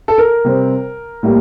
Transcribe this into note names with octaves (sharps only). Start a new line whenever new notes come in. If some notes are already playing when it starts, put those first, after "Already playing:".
A4
A#4
C3 G3 C4
A2 G3 A#3